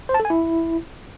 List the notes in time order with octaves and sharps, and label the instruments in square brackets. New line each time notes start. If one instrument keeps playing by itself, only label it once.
[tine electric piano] C5
A5
A4
G#5
E4